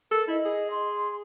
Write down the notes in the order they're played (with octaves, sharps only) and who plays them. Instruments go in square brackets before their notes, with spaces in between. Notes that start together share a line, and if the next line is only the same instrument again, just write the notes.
[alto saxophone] A4 [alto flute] A#4
[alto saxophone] E4 [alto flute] D#5
[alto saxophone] G#4
[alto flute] C6